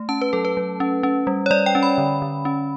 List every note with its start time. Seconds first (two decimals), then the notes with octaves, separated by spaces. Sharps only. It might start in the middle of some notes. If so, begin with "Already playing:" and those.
Already playing: A3
0.09 C#4 A5
0.21 B4
0.33 F#3 A4
0.45 B4
0.57 F#3
0.80 C#4
1.03 C#4
1.27 G3
1.46 C#5
1.51 G3 D5
1.66 G5
1.75 C#4
1.83 B5
1.98 D3
2.22 D3
2.45 C#4